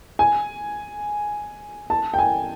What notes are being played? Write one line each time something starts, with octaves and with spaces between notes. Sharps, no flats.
G#5
A5
G5
G#5